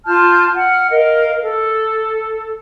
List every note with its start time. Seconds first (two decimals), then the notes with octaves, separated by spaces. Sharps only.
0.06 F4 A5 F6 G6
0.56 F5 F#5 F6
0.90 A#4 D#5 F5
1.41 A4